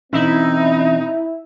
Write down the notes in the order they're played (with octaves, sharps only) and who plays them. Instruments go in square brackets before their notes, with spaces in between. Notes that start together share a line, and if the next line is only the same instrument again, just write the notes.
[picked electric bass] B2 E3 C#4 [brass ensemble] C4 [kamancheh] D#4 [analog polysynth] E4